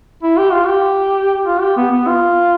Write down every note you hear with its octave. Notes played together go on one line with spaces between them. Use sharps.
E4
G4
F4
G4
F4
G4
B3
B3
F4